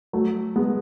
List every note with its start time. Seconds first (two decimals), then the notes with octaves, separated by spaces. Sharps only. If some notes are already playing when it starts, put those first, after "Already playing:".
0.13 F#3 A3
0.56 G#3 B3